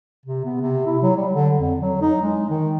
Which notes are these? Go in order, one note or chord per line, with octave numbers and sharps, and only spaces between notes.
C3
B3
C3
E4
F#3
G3
D3
F2
F#3
D#4
G#3
D#3